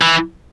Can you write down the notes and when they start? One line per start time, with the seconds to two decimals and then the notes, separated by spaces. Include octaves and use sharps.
0.01 E3